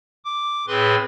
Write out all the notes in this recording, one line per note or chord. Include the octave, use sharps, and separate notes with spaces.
D6
A2 C4 G#4 B4 C6